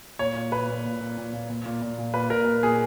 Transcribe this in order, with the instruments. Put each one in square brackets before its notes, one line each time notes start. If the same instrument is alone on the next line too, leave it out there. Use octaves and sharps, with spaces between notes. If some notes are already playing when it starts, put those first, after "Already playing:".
[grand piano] A#2 C#5
A#2
A#2 B4
A#2
A#2
A#2
A#2
A#2
A#2
A#2
A#2
A#2
A#2 B4
A#2 A#4
A#2
A#2 G#4